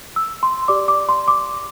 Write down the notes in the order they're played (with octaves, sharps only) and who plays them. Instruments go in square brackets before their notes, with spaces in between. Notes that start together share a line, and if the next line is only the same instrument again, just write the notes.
[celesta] E6
C6
G4 D5 D6
D6
C6
D6